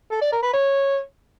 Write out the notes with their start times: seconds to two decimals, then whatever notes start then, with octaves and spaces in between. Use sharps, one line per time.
0.11 A4
0.22 D5
0.32 A#4
0.43 B4
0.53 C#5